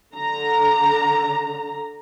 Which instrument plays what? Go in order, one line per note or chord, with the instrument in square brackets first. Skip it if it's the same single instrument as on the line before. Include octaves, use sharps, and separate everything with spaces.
[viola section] D3 A#5